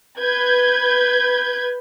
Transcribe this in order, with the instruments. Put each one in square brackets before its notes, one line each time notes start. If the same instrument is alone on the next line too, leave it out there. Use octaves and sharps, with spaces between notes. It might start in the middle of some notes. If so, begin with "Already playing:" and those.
[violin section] B4 G6 G#6